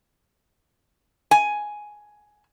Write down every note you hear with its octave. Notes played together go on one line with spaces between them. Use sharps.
G#5